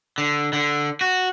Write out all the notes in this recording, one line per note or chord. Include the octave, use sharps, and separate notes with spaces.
D3
D3
F#4